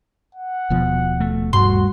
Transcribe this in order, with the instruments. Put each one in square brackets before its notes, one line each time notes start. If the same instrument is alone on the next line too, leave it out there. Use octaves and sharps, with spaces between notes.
[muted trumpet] F#5
[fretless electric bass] D#1 B2 F3
[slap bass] A3
[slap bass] G2 G3 A3 [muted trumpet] F#4 [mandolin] C6